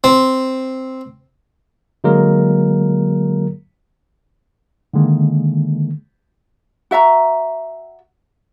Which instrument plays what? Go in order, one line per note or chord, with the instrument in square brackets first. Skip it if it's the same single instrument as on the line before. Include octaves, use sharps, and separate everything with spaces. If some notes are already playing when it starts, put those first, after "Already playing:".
[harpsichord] C4
[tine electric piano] D3 F#3 G#3 A#3 A#4
[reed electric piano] D3 D#3 G#3 A#3
[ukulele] F#4 E5 F5 A#5